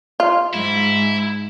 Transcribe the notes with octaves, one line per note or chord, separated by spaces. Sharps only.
F4
G#2 E4